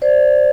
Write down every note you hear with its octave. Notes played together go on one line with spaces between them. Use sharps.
C5 D5